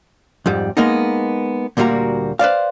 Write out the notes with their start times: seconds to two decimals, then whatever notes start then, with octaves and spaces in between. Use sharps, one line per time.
0.46 F2 G#2 G3
0.77 G#3 A#3 B3 D#4
1.77 D2 A#2 G3 A#3 F#4 A#5
2.39 B4 C5 D5 F5